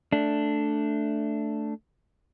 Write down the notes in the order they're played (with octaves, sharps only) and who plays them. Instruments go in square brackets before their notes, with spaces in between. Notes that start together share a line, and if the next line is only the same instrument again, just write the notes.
[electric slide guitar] A3 D4